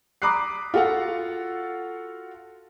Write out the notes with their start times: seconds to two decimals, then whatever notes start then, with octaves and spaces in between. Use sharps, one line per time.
0.22 A#5 B5 D6 D#6 F#6 C7
0.74 F4 F#4 A4 F5 F#5